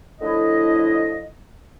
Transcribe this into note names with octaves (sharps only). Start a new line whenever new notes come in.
A2 D3 F3 E4 D#5